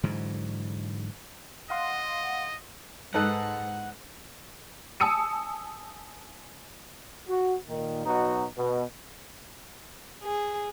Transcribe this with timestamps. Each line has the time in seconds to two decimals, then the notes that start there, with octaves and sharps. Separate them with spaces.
0.04 G#2 D3 E3 F#3
1.70 D#5 F5 F#5 C6
3.14 G#2 D#4 A4 B4 F#5 A5 F#6
5.00 G#5 A5 D#6 E6 C#7 D#7
7.28 F#4
7.69 A#2 D#3
8.06 B2 F#3 D#4 F#4
8.58 B2
10.23 G#4